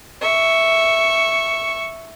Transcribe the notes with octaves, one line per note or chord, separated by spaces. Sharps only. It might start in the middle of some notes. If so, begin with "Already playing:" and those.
E5 C#6